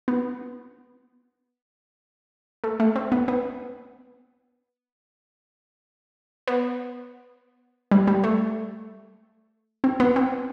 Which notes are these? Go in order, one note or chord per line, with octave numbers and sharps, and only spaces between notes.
B3
A3
A3
C4
B3
B3
B3
G3
G3
A3
C4
B3
C4